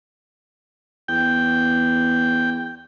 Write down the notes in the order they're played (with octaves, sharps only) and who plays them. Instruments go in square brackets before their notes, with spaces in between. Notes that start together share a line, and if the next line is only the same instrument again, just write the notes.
[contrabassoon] E2 [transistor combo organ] G5